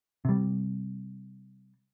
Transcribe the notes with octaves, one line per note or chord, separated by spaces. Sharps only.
C3 G3